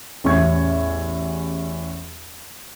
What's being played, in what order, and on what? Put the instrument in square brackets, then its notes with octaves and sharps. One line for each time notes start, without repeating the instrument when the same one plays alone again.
[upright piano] A1 E2 C#4 E5 C#6 G#6